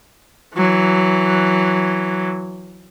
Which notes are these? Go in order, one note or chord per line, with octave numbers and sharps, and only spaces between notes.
E3 F#3